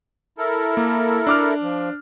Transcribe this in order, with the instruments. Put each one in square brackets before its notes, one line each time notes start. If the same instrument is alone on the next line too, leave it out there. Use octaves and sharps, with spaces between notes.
[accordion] E4 A4 A#4
[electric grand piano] A#3
D4 D6 F6
[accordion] F3